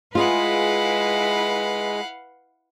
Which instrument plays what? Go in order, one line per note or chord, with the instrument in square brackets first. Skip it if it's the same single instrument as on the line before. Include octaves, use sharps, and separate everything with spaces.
[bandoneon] G#3 [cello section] E4 B4 [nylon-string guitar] F4 G#4 [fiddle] F5 F#5